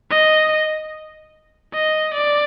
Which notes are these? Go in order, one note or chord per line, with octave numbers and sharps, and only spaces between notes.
D#5
D#5
D5